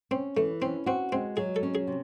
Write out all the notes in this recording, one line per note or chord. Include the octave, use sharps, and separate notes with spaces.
C4 C#4
E3 A3
C4 C#4
C4 F#4
G#3 C4
F#3 G#4
A4
C#4
G#4
C3